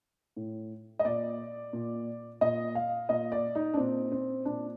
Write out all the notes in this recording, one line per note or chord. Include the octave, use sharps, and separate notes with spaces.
A2
D#5
A#2 D5
A#2
A#2 D#5
F5
A#2 D#5
D5
D#4
D4
A#2 C4
C4
A#2 D4